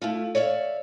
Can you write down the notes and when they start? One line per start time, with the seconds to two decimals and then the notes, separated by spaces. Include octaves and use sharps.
0.01 A3 E4 F4
0.35 C#5 D5 E5 F5